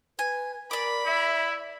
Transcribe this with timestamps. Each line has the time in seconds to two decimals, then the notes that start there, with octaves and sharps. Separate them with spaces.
0.19 B4 G#5
0.71 A#4 D5 B5 D6
1.07 E4 E5